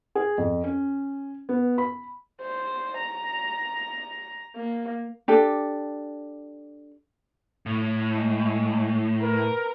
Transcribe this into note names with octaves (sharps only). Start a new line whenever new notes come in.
G#4
F2
C#4
B3
B5
C5
A#5
A#3
D4 G4 A4
A2
G#3
A#4 B4